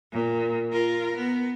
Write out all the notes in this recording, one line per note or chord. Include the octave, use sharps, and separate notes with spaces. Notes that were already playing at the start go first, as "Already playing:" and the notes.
A#2
F4 A#4
B3